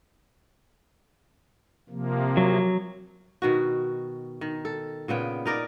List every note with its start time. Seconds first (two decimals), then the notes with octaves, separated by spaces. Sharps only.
1.90 C3 F3 A#3
2.37 F#3
3.42 B2 D#3 F#4
4.41 D#3
4.65 A4
5.08 A#2 C#3 B3 G5
5.46 D#4 A#4 D5